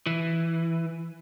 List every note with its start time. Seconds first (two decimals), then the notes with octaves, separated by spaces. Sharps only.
0.06 E3